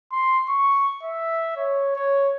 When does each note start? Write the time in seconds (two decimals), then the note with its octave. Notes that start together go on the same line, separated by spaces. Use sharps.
0.12 C6
0.49 C#6
1.03 E5
1.56 C#5
1.96 C#5